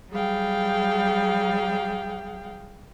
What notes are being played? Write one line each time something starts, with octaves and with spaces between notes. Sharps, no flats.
F#3 G3 G#4 F5 G5